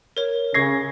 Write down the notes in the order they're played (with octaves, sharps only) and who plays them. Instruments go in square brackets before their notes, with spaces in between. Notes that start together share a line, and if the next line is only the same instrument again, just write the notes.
[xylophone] A#4 C#5
[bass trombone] C#3 [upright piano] C#6 G#6 A#6 [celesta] C7